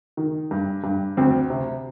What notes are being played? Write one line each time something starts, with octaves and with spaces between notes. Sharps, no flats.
D#3
G2
G2
D2 C4
C3